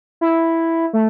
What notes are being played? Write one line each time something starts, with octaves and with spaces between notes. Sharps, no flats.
E4
A3